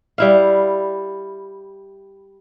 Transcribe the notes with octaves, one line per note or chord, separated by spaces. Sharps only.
G3 E4 F5